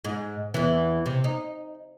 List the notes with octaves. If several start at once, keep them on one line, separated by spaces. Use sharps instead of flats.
G#2
E2 E3
C3
D#4